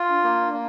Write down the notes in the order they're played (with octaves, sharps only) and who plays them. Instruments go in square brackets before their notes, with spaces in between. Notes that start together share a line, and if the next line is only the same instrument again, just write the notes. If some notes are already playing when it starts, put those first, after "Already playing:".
Already playing: [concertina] F4
[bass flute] D4
[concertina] A#3
A#3